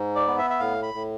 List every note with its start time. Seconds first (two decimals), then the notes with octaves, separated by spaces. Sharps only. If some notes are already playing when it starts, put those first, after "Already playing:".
Already playing: G#2
0.16 D5
0.27 B3
0.38 E5
0.50 E5
0.60 A2 F5
0.83 B5
0.94 A2